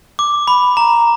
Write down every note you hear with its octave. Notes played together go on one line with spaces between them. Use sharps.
D6
B5
A#5